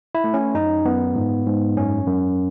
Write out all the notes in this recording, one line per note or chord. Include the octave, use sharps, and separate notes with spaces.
E4
A3
C#4
F#2 D#4
F#2 B3
G#2
G#2
F#2 C#4
F#2